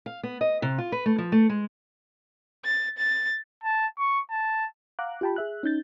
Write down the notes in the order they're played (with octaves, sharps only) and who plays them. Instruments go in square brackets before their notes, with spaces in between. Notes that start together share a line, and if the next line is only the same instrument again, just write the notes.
[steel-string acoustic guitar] F5
B3
D#5
C3
F4
B4
A3
F3
A3
G#3
[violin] A6
A6
[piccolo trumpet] A5
C#6
A5
[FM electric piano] F5 F#5 A#5 D6 F#6
F4 G4 G5 A5 B5
G#4 E5 F#6
C#4 D#4 G6 A6